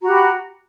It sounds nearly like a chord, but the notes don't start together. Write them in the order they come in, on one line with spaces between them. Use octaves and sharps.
F#4 A#5 G4 B5